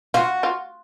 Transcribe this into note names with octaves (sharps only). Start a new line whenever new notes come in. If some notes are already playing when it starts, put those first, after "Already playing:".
F4 F#4
F4